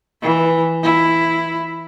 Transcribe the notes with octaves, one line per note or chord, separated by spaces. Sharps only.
E3
E4